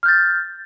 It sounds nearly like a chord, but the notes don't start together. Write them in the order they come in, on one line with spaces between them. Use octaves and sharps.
F6 G6 A6